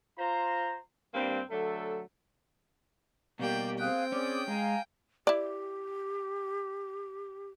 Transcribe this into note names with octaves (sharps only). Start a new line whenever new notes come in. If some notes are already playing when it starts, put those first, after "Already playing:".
F4 C5 A#5
G2 G3 A#3 C4
D3 F#3 A3 A4
B2 G3 A#3 G4 D5 G5
C4 G#4 F5 G5 F#6
C#4 G#4 D5 D6
G#3 F5 G#5 A#5
E4 G4 D5